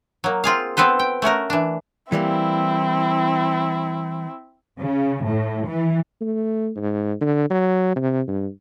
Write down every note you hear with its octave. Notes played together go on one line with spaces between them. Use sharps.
F#3 A#3
C4 F4 G#4 F5
B3 C4 A4 B4 C5
G5
A3 C#4 F#4 A#4
E3 D4
E3 G3 A#3 C4 E4
C#3
A2
E3
A3
G#2
D3
F#3
C3
G2